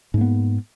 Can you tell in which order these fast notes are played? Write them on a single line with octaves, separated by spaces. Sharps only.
G#2 A#3 B3